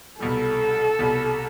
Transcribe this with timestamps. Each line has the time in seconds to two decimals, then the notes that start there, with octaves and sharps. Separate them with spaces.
0.20 C2 B2 G3 A4
0.99 C2 B2 G3